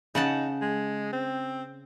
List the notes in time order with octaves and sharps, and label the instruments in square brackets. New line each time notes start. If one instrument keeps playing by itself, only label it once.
[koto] C#3 F#5 A5 [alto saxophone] D#4
[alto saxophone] G#3
C4